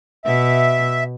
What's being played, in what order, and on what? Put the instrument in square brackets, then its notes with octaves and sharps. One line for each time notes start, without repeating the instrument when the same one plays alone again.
[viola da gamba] B2 [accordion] E5